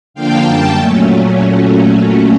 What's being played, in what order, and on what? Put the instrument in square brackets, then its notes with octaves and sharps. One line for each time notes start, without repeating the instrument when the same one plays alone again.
[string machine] D3 F3 A#3 D4 F5 G5
F#2 D3 G3 A#3 G5 A5
A#2 F#3 A3 C#4